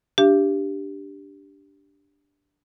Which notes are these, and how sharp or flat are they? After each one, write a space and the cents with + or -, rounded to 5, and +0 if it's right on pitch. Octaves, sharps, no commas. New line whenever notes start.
D4 -5 G4 +0 F5 -45